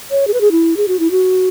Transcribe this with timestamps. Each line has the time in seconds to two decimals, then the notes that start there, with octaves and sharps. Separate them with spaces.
0.11 C#5
0.27 G#4
0.34 B4
0.41 G#4
0.51 E4
0.77 G#4
0.88 F#4
0.99 E4
1.11 F#4